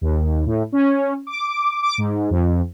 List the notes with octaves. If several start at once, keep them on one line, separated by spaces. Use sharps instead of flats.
D#2
A2
C#4
D6
D6
G#2
F2